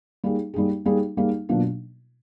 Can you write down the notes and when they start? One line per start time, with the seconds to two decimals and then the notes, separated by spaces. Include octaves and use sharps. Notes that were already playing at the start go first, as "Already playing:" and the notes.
0.24 G3 A#3 D#4 G#4
0.54 G3 A#3 D#4 G#4
0.85 G3 A#3 D#4 G#4
1.17 G3 A#3 D#4 G#4
1.49 B2 F#3 A#3 D4 F4